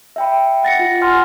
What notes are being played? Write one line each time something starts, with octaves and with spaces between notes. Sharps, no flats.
E5 G5 B5
F#5 A6 A#6 C#7
F4
F#5 G#5 C6 F6